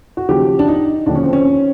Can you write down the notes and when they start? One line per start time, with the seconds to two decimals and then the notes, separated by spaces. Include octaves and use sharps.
0.17 F#4
0.29 D#2 C#3 F3 G4
0.59 D4
0.68 D#4
1.06 D#2 D3 F3 D4
1.15 C#4
1.24 C4
1.33 C#4